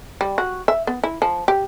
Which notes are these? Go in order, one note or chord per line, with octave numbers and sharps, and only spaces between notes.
G3
F#4
E5
B3
E4
F3
G4